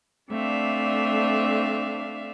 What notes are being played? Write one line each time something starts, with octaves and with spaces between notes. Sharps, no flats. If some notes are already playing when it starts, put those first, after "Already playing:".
A3 C4 D4 D5 E5 F5